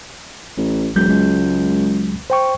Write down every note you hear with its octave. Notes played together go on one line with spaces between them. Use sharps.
A1
E1 F#3 G#3 G6
C#2
C5 G5 C#6